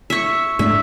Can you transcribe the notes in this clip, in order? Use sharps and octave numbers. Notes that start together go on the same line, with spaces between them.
E5 C#6
G#2 A3 D4 E5